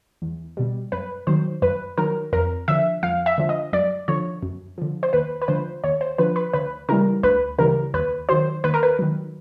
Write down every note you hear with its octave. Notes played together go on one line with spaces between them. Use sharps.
E2
B2 G3
F#2 B4
D#3 F#3 C5
F#2 B4
D#3 F#3 A#4
F2 A#4
D3 F3 E5
F2 F5
E5
D3 F3
D#5
F#2 D5
D3 F3 C#5
F#2
D3 F3
C5
D#2 B4
B4
D3 F3 C5
D#2 C#5
C5
D3 F3 B4
B4
D2 B4
C#3 E3 G3 A#4
D2 B4
C#3 E3 G3 A#4
D#2 B4
D#3 F#3 C5
D#2 B4
A#4
B4
D#3 F#3